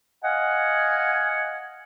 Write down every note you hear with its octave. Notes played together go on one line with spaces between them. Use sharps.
D#5 F5 F#5 G#5